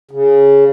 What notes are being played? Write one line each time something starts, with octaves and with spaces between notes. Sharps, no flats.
C#3